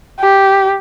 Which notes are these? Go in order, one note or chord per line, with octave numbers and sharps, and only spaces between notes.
G4